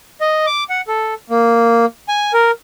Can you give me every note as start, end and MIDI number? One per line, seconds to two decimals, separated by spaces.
0.21 0.46 75
0.46 0.64 86
0.69 0.81 78
0.88 1.14 69
1.30 1.86 58
2.08 2.32 80
2.33 2.51 70